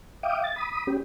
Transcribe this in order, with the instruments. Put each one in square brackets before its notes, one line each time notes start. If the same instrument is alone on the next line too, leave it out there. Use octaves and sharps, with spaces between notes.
[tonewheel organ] E5 F5 G5 D6 D#6
A6
B5 D#6
C#4 G4